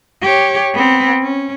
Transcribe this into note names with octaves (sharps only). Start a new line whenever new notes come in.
G4 C#5
B3 C4
C#4